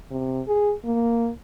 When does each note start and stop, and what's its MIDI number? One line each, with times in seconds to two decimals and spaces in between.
0.11 0.41 48
0.48 0.73 68
0.85 1.30 58